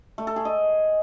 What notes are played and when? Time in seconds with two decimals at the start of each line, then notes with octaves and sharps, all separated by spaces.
0.18 A3
0.27 A4
0.36 G#4
0.45 D#5